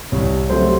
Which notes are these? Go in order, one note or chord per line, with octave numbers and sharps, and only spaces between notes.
C2 C#5
C3 F#3 A3 C5